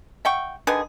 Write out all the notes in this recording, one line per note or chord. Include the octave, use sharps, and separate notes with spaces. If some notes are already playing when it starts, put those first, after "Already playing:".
E5 F#5 G5 C#6
D3 D#3 G#4 B4